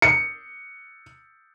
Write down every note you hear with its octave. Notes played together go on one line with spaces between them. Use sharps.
C#7